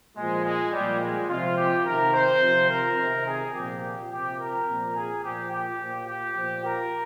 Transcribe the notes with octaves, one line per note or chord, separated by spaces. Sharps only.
A#2 F3 G#3
G#3
A#2 F3 G3
G#3
C3 F3 F4
G4
C3 D#3 A#4
C5
C3 F3
A#4
C3 D#3
G#4
A#2 F3 G4
C3 F3 G4
A#4
A#2 F3
G#4
A#2 F3 G4
G4
A#2 F3
G4
A#2 F3
A#4